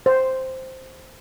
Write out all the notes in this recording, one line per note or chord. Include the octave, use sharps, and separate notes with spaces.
C5